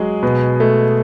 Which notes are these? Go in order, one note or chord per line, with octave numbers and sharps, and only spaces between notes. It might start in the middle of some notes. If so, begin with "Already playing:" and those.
Already playing: F#3 G#3 G#4
B2
A3